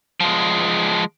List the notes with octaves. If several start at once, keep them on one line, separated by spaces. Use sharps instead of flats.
F3 G#3